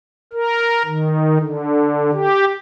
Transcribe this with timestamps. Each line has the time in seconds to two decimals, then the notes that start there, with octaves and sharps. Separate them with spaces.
0.33 A#4
0.85 D#3
1.38 D3
2.13 G4